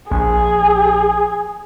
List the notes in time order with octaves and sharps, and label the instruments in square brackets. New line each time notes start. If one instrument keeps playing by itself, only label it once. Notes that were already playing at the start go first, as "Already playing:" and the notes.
[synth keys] A#1 [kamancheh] G#4